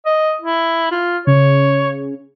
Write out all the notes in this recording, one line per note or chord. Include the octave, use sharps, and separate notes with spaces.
D#5
E4
F4
C#3 C#5